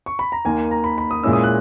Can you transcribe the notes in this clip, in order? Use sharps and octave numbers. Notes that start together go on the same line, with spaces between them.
C#6
B5
A#5
D#2 D#3 A#3 G#5
G#5
A#5
B5
B5
D#6
A#2 G#3 C#4 E4 E6
D#6
F#6